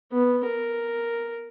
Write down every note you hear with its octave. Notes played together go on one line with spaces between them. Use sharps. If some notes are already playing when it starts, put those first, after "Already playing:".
B3
A#4